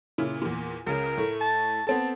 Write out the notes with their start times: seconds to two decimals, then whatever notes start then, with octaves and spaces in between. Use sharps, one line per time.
0.18 A#2 C#3 E4
0.42 E2 A#2
0.86 C#2 C#3 A#4
1.17 A2 A3
1.41 A5
1.87 B3 C4 A4 A5